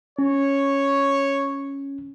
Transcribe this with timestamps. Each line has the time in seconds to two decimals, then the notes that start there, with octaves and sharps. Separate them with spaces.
0.19 C#4 C#5